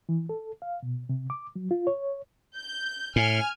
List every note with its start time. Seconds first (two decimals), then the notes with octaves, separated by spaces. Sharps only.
0.09 E3
0.29 A4
0.62 F5
0.83 B2
1.09 C3
1.30 D6
1.56 F#3
1.71 F4
1.87 C#5
2.57 G6
3.16 A2 G#5 F6